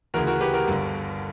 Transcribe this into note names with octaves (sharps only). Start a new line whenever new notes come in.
D2 C#3 E3 F#4 A#4
F#4 A#4
G4 B4
F#4 A#4
G1 G2 D3